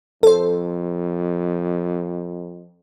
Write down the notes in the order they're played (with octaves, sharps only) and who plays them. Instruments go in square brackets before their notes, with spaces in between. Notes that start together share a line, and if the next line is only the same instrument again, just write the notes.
[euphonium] F2 [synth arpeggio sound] A4 C5